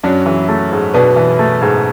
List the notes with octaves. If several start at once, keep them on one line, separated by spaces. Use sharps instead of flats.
F#2 F#3 D4
E3
A3
G#2
B2 B3 D4
E3
A3
G#2